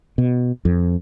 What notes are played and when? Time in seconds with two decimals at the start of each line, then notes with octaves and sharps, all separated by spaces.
0.18 B2
0.65 F2